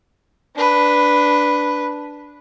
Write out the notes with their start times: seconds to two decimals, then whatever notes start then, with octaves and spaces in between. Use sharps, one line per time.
0.56 D4 B4